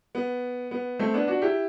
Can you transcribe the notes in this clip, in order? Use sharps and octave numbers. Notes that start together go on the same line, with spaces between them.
B3
B3
A3 C4
B3 D4
D4 F#4
E4 G4